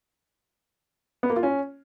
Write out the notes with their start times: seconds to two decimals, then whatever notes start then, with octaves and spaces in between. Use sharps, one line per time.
1.23 B3
1.30 A#3
1.36 F4
1.43 C#4